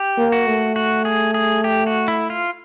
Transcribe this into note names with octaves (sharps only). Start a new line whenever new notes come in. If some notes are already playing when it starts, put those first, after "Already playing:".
Already playing: G4
A#3
F#4
A3
F#4
G#4
G#4
G4
F#4
E4
F4